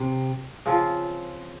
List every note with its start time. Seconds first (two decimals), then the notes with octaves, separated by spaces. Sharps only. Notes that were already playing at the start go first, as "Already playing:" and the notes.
Already playing: C3
0.66 C#3 F3 C4 F4